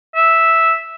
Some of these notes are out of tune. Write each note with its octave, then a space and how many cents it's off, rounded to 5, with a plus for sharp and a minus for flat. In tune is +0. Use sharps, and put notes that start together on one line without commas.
E5 -5